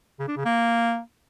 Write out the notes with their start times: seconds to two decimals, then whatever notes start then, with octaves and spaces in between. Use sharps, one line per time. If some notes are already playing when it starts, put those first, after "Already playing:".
0.20 C#3
0.28 D4
0.37 C#3
0.45 A#3